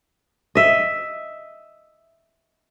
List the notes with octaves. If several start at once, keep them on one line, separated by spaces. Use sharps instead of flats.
D#5 E5